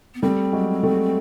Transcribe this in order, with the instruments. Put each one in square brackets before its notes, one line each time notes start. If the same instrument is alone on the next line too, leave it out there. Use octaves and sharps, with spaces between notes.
[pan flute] B3
[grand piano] G3 A3 [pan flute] C4
[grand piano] F#3 G#3
G3 A3